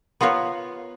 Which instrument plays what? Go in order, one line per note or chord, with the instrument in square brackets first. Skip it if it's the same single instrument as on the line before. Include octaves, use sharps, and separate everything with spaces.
[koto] B3 F4 A#4 B4 C#5